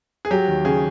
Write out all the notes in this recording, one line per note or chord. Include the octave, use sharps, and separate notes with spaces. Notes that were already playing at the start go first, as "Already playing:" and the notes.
G#4
F#3 G4
D#2
C#3 G#4